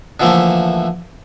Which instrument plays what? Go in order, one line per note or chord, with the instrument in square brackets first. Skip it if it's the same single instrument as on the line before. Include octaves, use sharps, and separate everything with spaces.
[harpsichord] D3 E3 F3 A3 A#3